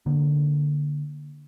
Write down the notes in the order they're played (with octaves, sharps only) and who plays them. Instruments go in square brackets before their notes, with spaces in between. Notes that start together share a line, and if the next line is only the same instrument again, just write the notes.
[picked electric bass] D3 A#3